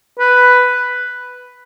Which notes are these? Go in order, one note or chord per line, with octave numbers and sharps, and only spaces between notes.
B4